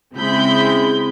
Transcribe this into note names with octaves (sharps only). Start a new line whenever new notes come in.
C#3 G#3 C4 E4 B5 G6